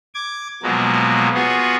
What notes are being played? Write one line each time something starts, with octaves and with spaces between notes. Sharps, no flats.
D6 G#6
B2 F3 F#3 G#3 A#3
B3 F4 F#4 G#4